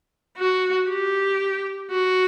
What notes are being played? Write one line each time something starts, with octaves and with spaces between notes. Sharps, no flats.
F#4
G4
F#4